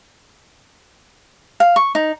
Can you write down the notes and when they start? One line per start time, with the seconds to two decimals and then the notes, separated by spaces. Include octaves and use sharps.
1.60 F5
1.76 C#6
1.95 D#4